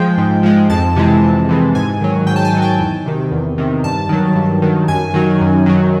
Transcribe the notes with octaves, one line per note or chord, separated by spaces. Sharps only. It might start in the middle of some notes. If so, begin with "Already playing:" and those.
Already playing: F3 G#3 G5
G#2
F3 G#3
F2 A5
C3 E3 G#3
F2
C3 E3 G#3
G#2 G#5
D#3 F#3
G#2 G5
A5
G#5
D#3 F#3
G5
E2
C3 D#3
E2
C3 D#3
G2 A5
D#3 F#3
G2
D#3 F#3
F#2 G#5
D#3 F#3
F#2
D#3 F#3